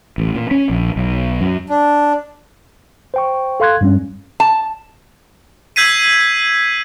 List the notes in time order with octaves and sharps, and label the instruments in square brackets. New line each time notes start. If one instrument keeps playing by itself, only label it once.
[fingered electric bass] A1
A#2
C#4
A#1
B1
F#2
[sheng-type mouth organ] D4
[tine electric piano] C5 G5 C#6
A4 F5 C6 F#6 G#6
G2 G3 C#4
[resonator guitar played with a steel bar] A5
[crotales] E6 G6 G#6 B6 C7 D#7